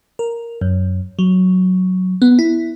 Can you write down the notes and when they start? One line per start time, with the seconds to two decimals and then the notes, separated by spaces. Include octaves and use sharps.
0.19 A#4
0.61 F#2
1.19 F#3
2.22 B3
2.39 E4